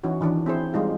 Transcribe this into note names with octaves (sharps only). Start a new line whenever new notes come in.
E3 C#4 D#4 E4 F#4
D#3 E3 C#4 D4
C4 E4 G#4 C5
G3 G#3 D#4 F4 G#4